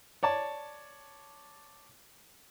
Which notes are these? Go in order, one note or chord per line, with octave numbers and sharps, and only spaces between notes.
C#5 D5 A5